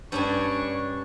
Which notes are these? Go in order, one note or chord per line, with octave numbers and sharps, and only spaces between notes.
G2 C#4 D4 G#5 C#6